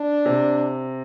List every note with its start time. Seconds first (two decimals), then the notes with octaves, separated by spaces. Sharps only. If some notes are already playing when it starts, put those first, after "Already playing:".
Already playing: D4
0.25 C3